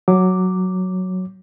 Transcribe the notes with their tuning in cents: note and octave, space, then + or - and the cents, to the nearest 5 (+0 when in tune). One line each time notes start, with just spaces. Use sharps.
F#3 +0 D6 +0